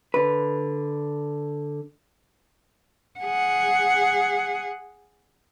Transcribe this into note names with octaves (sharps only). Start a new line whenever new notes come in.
D3 B4
G#4 F#5